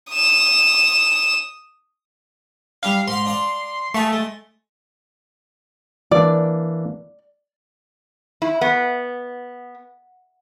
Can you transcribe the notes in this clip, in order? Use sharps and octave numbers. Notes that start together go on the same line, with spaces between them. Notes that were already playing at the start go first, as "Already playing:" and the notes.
D#6 E7
G3 D4 E4 F5
G#2 F5 C6
D4 D5 F5
A3 G#4 F5 A5
G#3
E3 A#3 D4 D5
E4
B3